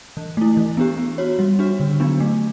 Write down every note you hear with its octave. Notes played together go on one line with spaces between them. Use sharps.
E3
A3 E4
E3
B3 D4 G4
B3
F#4 C#5
G3
D4 F#4
D3
F#3 B3 D4
A3